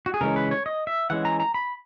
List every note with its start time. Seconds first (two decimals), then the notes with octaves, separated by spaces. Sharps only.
0.06 F#4
0.14 G#4
0.21 C#3 E3 G#3 C#4 A#4
0.36 B4
0.51 C#5
0.66 D#5
0.87 E5
1.10 E3 G#3 C#4 F#5
1.25 A#5
1.40 A#5
1.54 B5